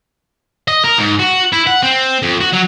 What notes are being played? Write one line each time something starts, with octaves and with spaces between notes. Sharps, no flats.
D#5
A#4
G#2
F#4
E4
F#5
C4
F2
F#4
F#3